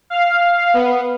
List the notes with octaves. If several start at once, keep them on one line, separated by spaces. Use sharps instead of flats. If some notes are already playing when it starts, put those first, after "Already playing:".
F5
B3